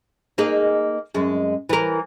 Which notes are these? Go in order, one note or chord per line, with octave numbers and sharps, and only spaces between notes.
A#3 D#4 G#4
F#2 G#3
E3 A#4